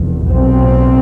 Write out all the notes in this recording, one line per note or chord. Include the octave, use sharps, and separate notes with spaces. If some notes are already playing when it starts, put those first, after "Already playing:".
Already playing: F1 E2
B1 B2 C4